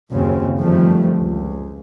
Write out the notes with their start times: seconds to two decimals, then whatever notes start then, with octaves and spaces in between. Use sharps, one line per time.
0.10 F#1 D#2 C#3 C4
0.60 G1 F2 D#3 F3 G3 A3
1.18 C#2